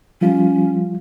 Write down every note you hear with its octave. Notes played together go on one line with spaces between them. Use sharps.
F3 G3 C#4 F4